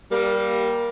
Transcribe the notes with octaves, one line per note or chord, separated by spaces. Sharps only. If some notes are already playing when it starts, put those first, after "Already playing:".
G3 A#3